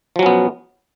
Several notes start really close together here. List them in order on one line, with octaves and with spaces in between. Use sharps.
F3 F#3 C#4 B3